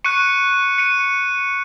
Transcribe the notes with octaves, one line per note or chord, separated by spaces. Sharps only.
C#6 F#6 C#7 D#7
C#7 D#7